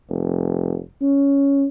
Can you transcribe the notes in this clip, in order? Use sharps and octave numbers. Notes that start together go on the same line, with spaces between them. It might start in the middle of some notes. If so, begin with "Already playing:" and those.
F1
C#4